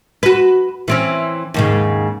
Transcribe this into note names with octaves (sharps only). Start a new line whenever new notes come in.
F#4 B4
E3 C4 C#4
D#2 G#2 C#3